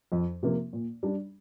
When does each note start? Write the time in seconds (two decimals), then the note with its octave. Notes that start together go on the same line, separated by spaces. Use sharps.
0.12 F2
0.43 C3 F3 A#3
0.73 A#2
1.03 G3 D4